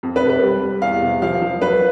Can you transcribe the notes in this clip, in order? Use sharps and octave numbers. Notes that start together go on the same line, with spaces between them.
F2
B4
C3
B4
G3
G3
E2 F5
C3
F3 F5
F3
F#3 B4